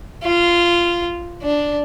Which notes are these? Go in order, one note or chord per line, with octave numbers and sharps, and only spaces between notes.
F4
D4